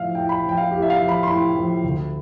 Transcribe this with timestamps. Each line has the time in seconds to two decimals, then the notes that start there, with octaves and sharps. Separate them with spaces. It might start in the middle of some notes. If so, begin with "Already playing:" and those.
Already playing: A2 F3 E5 F5
0.15 A2 G5
0.29 B5
0.43 F3
0.49 G5
0.57 F5
0.71 A2 G4
0.82 E5
0.90 F5
0.99 F3
1.09 B5
1.23 C6
1.27 A2 B5
1.56 F3
1.84 D2